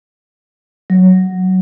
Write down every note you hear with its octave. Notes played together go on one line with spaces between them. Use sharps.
F#3